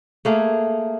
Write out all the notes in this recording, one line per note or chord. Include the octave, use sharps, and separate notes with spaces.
A3 A#3 G#4